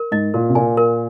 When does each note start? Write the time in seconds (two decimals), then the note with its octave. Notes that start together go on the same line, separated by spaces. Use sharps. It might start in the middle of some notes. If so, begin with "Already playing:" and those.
Already playing: A#4
0.12 G#2 D#5
0.34 A#2 A#4
0.49 C3
0.55 A#2 G#5
0.77 A#4